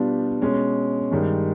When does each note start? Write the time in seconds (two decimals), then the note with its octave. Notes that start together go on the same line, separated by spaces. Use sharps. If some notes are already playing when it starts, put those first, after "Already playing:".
Already playing: B2 G3 B3 D4 F4
0.42 B2 G#3 C#4
1.11 G2 D#3 G#3